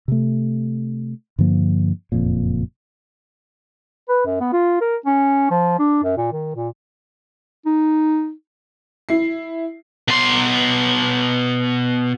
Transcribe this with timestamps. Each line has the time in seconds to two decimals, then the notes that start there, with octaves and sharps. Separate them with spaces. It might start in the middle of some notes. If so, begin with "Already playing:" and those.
0.08 C3 A3
1.38 G2 D3 F3 A#3
2.12 F#1 F2 A#2
4.09 B4
4.26 F#2
4.40 B3
4.53 F4
4.81 A#4
5.06 C#4
5.51 F3
5.79 D4
6.03 F#2
6.17 A#2
6.32 D#3
6.56 A#2
7.66 D#4
9.09 E4 C7
10.08 B2 C6